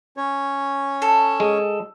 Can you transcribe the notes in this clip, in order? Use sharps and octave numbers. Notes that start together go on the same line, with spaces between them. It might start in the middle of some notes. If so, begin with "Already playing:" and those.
C#4 C#5
A4
G#3